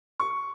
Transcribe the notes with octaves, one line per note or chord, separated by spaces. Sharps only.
C#6